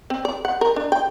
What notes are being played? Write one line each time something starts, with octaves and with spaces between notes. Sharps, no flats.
C4
D5
F#5
A#4
D4
G5